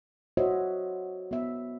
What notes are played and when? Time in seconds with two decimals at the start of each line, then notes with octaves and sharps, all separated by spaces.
0.37 F#4 C5 C#5 D#5 E5
1.31 B3 E5